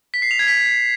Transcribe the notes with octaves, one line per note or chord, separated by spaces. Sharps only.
B6
C7
F7
G#6
B6